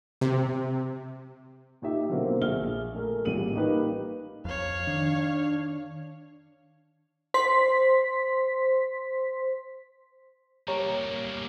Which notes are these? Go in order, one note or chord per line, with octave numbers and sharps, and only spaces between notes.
C3
A#2 D#4 G4 E5
B2 D3 F#3 A#3 C4
A#1 E5 F6 G7
A3 G#4 A#4
A1 A#2 G3 D#7 F#7
A#3 D#4 G4 B4
F2 C#5 F5
D#3 D4
C5 C6 B6
G3 A#3 G4 C#5 A#5